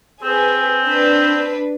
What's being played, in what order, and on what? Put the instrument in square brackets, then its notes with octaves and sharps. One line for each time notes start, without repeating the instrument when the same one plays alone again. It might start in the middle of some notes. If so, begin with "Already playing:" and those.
[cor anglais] C4 [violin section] G#4 B4
[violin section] D4 B4